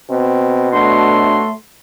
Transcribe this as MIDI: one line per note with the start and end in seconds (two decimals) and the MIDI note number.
0.10 1.50 47
0.10 0.72 60
0.73 1.50 57
0.73 1.40 62
0.73 1.51 66
0.73 1.51 73
0.73 1.51 84